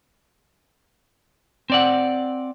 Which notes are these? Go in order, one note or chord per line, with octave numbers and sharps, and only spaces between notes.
C4 D5 F#5